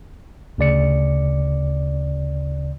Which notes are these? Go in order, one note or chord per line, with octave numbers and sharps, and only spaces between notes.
D2 C#3 D5 C#7